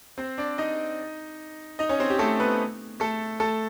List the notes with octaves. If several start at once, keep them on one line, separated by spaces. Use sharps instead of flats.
C4 C5
D4 D5
D#4 D#5
D#4 D#5
C#4 C#5
C4 C5
G4
A3 A4
B3 B4
A3 A4
A3 A4